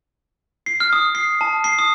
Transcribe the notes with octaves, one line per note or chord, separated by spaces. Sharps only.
C7
F6
D#6
C7
A5
C7
D#6